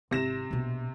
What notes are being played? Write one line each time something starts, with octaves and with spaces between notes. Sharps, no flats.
G#1 C3 E4 A#6 E7
A#1 B2